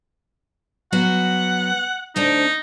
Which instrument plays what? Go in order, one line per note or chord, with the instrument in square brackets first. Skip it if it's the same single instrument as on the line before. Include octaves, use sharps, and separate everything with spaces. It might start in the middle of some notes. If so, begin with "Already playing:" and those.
[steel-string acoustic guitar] F#3 B3 F#4 [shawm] F#5
[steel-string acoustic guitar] D2 C4 D4 [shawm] D#4